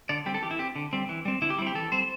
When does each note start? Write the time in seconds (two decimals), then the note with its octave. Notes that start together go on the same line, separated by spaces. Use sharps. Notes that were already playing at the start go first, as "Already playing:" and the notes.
0.09 D3 D5
0.26 G3 C4 G4
0.34 A4
0.42 E3 G4
0.51 E4
0.59 C4 G4
0.76 D3
0.93 G3 C4
1.09 E3
1.25 G3 C4
1.42 D3 E4
1.50 G4
1.58 G3 E4
1.62 C4 G4
1.75 E3 A4
1.92 G3 C4 C5